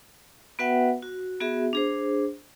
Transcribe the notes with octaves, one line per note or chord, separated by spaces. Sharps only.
B3 F#4 B4 E5 F#5 G5
F#4
B3 F#4 G#4 E5
D4 G#4 C5